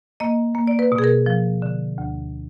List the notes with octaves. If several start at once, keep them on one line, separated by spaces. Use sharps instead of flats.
A#3 D#5
A#3
D5
B4
B2
G#4
A#4
F3
D3
D2